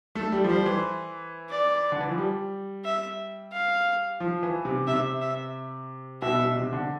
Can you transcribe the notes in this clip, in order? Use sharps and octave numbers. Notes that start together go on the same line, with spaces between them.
A3 A4
G3
F3
G3 C5
E3
D5
D3
E3
F3
G3
E5
F5
F3
E3
C3
C3 E5
E5
B2 E5
B2
C3
D3